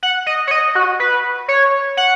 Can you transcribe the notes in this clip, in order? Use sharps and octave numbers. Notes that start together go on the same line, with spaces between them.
F#5
D#5
C#5
D#5
F#4
B4
C#5
F#5